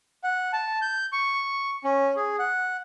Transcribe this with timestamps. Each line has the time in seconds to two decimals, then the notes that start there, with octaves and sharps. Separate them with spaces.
0.24 F#5
0.53 A5
0.82 G6
1.13 C#6
1.84 C#4
2.16 G#4
2.39 F#5